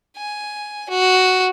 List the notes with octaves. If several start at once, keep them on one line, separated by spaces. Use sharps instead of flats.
G#5
F#4